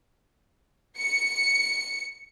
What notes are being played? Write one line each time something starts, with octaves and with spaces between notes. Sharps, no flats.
C#7